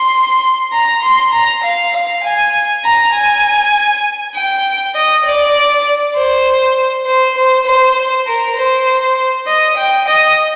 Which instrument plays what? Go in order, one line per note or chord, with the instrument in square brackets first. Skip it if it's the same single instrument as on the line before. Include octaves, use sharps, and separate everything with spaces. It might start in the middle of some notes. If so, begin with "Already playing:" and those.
Already playing: [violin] C6
A#5
C6
A#5
F5
F5
G#5
A#5
G#5
G5
D#5
D5
C5
C5
C5
C5
A#4
C5
D#5
G5
D#5